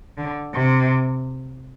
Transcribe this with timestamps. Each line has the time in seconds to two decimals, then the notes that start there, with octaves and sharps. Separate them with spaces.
0.17 D3
0.54 C3